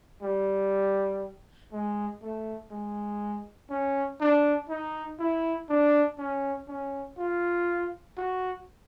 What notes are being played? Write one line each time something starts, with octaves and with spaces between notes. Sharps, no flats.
G3
G#3
A3
G#3
C#4
D4
D#4
E4
D4
C#4
C#4
F4
F#4